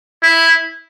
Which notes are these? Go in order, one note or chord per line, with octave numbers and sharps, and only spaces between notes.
E4